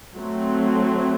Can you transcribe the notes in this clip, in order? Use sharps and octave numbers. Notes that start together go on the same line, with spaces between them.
F#3 A3 C4